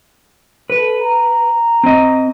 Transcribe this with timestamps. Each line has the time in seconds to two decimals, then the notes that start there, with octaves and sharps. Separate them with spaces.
0.70 A4 B4
1.00 A#5
1.84 C4 D#5